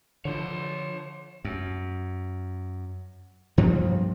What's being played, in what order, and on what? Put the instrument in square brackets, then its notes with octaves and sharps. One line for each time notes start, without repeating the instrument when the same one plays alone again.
[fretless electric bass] D3 F3 [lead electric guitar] C#5 C6
[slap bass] F#2
G2 F3 G3 A#3